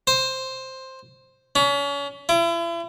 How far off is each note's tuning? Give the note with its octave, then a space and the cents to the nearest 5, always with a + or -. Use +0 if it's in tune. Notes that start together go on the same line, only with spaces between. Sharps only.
C5 +5
C#4 +35
E4 +40